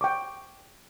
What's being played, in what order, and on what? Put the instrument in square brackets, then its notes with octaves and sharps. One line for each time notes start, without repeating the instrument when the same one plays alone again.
[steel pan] G5 C#6 D6